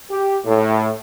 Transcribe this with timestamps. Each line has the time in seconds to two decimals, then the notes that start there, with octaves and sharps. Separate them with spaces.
0.11 G4
0.45 A2